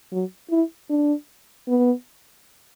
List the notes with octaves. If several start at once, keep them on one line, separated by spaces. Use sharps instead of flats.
F#3
E4
D4
B3